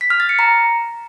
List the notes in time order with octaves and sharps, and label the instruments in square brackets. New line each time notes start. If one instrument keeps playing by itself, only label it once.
[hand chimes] B6
F6
A6
C#7
A#5